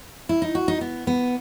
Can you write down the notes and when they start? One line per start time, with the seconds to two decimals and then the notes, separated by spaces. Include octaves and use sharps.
0.29 E4
0.42 D#4
0.55 F#4
0.68 D#4
0.81 B3
1.07 B3